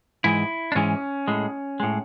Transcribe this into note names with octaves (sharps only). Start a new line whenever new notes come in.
G#2 E3 G#3 E4
D4
G#2 E3 G#3 C#4
A2 G#3
A2 G#3